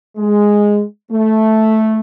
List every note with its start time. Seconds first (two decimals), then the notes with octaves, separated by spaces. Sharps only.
0.17 G#3
1.12 A3